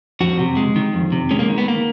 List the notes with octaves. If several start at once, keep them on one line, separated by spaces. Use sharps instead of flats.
F2 F#4
C3
G#3
D#3
F2
C3
G#3 C#4
A#3
D#3
B3
A#3